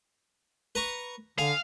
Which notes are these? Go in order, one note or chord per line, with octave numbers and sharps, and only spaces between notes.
B4 A#5 C#6
D3 G#4 F5